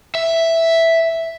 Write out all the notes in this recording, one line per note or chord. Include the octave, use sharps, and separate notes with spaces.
E5